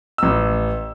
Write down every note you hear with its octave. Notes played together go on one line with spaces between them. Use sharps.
A1 E6